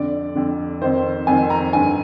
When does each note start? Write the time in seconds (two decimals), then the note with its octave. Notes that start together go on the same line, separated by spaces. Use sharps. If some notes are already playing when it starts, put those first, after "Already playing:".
Already playing: F2 D3 D5
0.35 F2 D3
0.82 F2 D#3 C5
1.27 F2 D#3 G#5
1.50 A#5
1.73 G2 D3 G#5